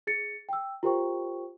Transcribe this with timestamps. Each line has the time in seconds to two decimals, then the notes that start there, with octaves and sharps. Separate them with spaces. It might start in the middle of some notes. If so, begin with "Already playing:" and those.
0.07 G#4 A6 C#7
0.49 G5 E6
0.83 F4 G4 A#4 C5 G5 C#6